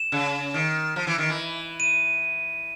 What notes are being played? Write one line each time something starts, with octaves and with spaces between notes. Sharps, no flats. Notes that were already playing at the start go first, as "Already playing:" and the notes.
Already playing: E7
C#3
D#3
F3
E3
D#3
E3
D#7